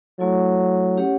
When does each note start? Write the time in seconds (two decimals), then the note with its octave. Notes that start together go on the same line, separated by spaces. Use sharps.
0.19 F#3 A3 E4 A4
0.98 C#4 G4 C#5 F#5